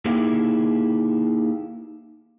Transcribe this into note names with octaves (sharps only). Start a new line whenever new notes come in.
A#3 D#4 E4 G4 G#4